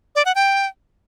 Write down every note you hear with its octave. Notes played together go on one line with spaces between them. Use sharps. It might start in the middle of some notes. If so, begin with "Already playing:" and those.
D5
F#5
G5